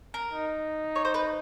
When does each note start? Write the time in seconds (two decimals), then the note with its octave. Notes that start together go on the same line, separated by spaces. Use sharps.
0.14 A#4
0.33 D#4
0.96 C#5
1.05 C5
1.14 B4